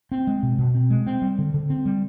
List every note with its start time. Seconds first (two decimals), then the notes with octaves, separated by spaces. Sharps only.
0.12 C4
0.27 G#3
0.43 B2
0.58 B2
0.75 C4
0.90 G#3
1.06 C4
1.22 G3
1.38 D3
1.54 D3
1.70 C4
1.85 G3